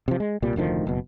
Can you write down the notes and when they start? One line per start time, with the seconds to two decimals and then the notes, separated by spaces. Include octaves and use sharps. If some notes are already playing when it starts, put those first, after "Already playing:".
0.08 C3 F3
0.20 G#3
0.42 C2 A#2 G3
0.56 F1 D2 D#3 F3
0.87 F#1 B2